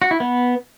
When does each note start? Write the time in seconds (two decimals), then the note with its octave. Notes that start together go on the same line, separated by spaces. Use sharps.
0.02 F#4
0.11 E4
0.20 B3